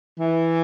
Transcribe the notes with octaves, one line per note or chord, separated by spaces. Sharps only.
E3